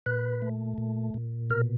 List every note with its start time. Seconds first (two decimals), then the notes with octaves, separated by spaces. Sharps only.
0.06 A#2 B4
0.42 A3
0.78 A#2
1.14 A#2
1.50 B2 A#4